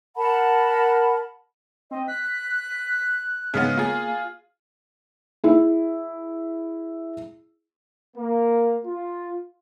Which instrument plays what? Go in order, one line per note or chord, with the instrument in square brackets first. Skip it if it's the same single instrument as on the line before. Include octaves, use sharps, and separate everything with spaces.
[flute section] A#4 F#5 A5 B5
[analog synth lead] C4 [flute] D#5
[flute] F#6 [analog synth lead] B6
[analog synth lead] G#2 [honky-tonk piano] C#3 G#3 B3
[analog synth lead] A#3 [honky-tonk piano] F4 G#4
[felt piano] E4 G#4
[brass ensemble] A#3
F4